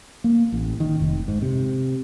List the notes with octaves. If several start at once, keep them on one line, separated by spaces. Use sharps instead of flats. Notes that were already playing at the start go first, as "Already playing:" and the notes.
A#3
A1
D#3
F1
G#2
C3